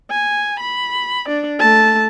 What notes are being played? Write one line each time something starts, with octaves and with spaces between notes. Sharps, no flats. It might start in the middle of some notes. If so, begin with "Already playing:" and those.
G#5
B5
D4 D5
A3 A5